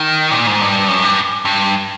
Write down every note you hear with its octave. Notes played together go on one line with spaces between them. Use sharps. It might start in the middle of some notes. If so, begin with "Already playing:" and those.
Already playing: D#3
A#2
G#2
G2
F#2
G2
G2